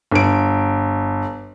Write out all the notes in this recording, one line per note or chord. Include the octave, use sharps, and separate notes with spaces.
G1 D7